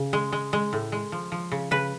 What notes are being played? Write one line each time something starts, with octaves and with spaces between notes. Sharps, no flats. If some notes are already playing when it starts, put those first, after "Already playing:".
Already playing: C#3
G#3
G#3
G#3
A2
G#3
F3
F3
C#3
C#3 B4